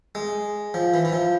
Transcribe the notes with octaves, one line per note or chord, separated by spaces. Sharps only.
G#3
F3
E3
E3
F3